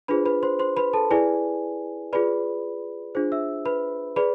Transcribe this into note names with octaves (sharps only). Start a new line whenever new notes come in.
D4 F4 G#4 B4 C5 B5
B4 B5
C5 C6
C5 C6
B4 B5
A4 A5
E4 G#4 B4 D5 G#5
F4 G#4 B4 D5 B5
D4 F4 G#4 C5
E5 E6
B4 B5
G#4 B4 D5 B5